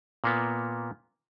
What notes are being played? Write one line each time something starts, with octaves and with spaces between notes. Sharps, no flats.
A#2 A#3 B3